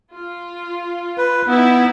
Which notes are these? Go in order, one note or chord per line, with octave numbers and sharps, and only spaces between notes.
F4
B4
B3 D#4 E4